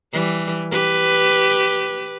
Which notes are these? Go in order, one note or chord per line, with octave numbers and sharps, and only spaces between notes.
E3 G3
G4 B4